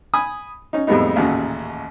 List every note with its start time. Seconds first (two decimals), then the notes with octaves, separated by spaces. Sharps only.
0.14 G#5 B5 D#6
0.73 C#4 D#4
0.87 F2 A2 G3 G#3 B3 D#4
1.16 A1 D#2 A#2 C#3 F#4